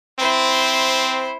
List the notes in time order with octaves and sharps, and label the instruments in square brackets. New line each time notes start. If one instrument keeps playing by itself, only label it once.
[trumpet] C4 [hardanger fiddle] E4 C5